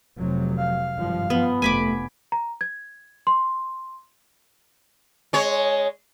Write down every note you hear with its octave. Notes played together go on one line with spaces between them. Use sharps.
F1 C3 F#3
F5
G#1 G2 F3
F3 B3
F1 A3 G#5 B5 D6
A#5
G#6
C6
G#3 C#5